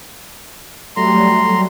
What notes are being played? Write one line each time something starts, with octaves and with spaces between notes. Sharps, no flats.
F#3 G3 A3 A#5 C6